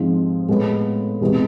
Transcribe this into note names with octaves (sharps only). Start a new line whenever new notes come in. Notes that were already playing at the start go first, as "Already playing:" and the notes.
Already playing: G#2 F3 G#3 C4
A2 G#3 B3
E2 C3 G#3 B3 E4